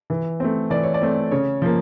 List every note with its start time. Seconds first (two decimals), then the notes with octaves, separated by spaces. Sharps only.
0.10 E3
0.40 A3 C4
0.70 E3 D5
0.83 C#5
0.94 D5
1.02 A3 C4
1.32 C#3 C#5
1.62 F3 A#3